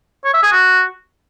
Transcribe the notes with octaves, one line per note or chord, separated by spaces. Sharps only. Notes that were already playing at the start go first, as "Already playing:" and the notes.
C#5
E5
G#4
F#4